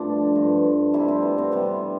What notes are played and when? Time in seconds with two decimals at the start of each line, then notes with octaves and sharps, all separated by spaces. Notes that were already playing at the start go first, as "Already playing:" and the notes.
Already playing: G2 F3 A3 D4
0.35 G2 F3 A3
0.94 C3 G3 E4
1.08 C4
1.23 B3
1.38 C4
1.52 C3 G3 B3